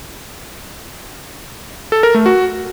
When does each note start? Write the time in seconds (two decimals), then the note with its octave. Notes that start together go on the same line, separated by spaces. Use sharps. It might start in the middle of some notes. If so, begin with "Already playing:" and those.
1.92 A4
2.03 A#4
2.14 A3
2.26 F#4